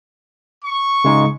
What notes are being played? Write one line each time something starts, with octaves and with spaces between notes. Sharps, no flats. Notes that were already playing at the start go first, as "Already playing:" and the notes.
C#6
C#3 G#3 D#4